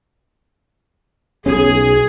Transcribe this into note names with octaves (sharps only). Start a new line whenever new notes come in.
B1 B2 C#4 G#4